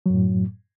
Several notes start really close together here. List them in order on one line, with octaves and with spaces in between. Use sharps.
F#3 F#2 A2